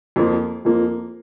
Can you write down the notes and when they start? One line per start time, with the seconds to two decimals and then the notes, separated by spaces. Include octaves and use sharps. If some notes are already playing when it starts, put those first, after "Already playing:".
0.16 F2 F3 A#3
0.65 F2 F3 A#3